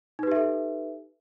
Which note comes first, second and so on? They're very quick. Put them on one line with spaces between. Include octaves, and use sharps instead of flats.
D#4 B4 G4 E5 A4